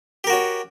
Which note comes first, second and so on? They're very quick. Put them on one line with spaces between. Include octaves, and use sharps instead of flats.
G4 A#4 F#4 C#5